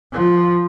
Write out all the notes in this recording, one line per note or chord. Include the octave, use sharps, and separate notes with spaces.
F3